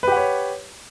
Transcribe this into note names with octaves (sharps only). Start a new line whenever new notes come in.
G4 B4 C#5 F#5